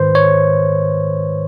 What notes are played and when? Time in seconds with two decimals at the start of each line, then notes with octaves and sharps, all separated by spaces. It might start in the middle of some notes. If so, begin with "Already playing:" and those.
Already playing: G#2 D#3 B4 C5
0.15 C#5